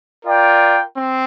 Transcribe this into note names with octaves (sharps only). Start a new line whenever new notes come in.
F4 A#4 D5 G5
C4